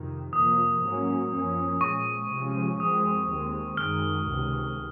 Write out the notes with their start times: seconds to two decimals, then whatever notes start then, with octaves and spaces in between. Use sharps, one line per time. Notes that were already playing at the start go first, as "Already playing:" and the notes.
Already playing: F2 C3 D#3
0.33 F2 C3 F3 A#3 D#6
0.82 G#2 F#3 A#3 C#4
1.32 F#2 F3 A#3 C#4
1.81 A#2 F3 G#3 C#6
2.31 C3 F3 G#3 C#4
2.80 F#2 F3 G#3 C4 D#6
3.28 D#2 D#3 G#3 C4
3.77 F#2 D#3 G#3 F6
4.27 C#2 C3 D#3